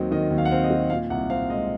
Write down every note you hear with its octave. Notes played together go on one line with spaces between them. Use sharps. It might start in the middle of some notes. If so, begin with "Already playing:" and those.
Already playing: D#2 D#3 F#3 C4 D#5
D#3 D#5
D#2
F5
F#5
C4 F5
D#5
F#3
A#2 F5
C2 F#5
C4 F5
G#3 D#5